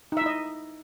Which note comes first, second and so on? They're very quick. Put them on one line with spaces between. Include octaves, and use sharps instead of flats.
D#4 E5 E4 D#5